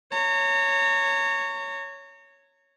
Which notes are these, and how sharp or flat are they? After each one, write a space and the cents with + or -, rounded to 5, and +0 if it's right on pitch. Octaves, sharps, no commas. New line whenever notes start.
C#5 +0 A#5 -35